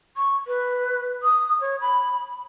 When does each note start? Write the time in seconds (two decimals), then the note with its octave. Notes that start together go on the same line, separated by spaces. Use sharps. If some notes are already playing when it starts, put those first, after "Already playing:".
0.17 C#6
0.48 B4
1.23 D#6
1.61 C#5
1.81 B5